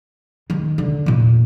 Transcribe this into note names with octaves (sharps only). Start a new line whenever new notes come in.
D#3 G#3
D3
E2 A#2